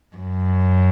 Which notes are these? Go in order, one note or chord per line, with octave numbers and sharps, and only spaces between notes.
F#2